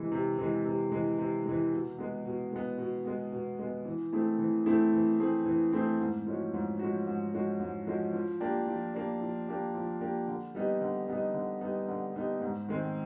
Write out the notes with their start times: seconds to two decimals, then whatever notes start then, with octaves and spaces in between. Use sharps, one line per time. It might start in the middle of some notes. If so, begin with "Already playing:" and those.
Already playing: C3 E3 G#3
0.12 C3
0.38 E3 G#3
0.65 C3
0.92 E3 G#3
1.18 C3
1.45 E3 G#3
1.72 B2
1.99 G#3 B3
2.25 B2
2.53 G#3 B3
2.78 B2
3.06 G#3 B3
3.32 B2
3.59 G#3 B3
3.85 E3
4.13 A3 C4 E4 G#4
4.39 E3
4.66 A3 C4 E4 G#4
4.93 E3
5.19 A3 C4 E4 G#4
5.46 E3
5.73 A3 C4 E4 G#4
6.00 G#2
6.26 F3 G#3 C#4 F#4
6.54 G#2
6.79 F3 G#3 C#4 F#4
7.07 G#2
7.33 F3 G#3 C#4 F#4
7.60 G#2
7.87 F3 G#3 C#4 F#4
8.13 F3
8.40 A#3 D4 G4
8.67 F3
8.94 A#3 D4 G4
9.21 F3
9.48 A#3 D4 G4
9.74 F3
10.01 A#3 D4 G4
10.28 D3
10.55 G3 B3 D#4
10.81 D3
11.08 G3 B3 D#4
11.34 D3
11.61 G3 B3 D#4
11.88 D3
12.15 G3 B3 D#4
12.41 G#2
12.68 D#3 G#3 C4